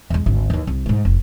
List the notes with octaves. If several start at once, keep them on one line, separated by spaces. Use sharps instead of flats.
E2 G#3
G#1 D2
D#2 E3
C2
G#2 G#3
F1